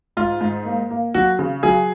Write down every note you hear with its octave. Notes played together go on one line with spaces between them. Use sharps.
G#2 F4
G#2
A#3
A#3
F#3 F#4
C#3
F#3 G#4